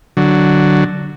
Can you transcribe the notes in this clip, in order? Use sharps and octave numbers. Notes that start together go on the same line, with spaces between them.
D3 F#3